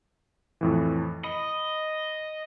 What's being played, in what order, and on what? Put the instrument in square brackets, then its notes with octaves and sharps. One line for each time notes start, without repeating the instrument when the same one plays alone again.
[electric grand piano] F2 A2 E3
[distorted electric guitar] D#5 [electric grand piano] B5